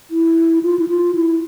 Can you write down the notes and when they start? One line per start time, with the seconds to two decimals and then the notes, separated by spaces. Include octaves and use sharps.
0.11 E4
0.63 F4
0.79 E4
0.88 F4
1.15 E4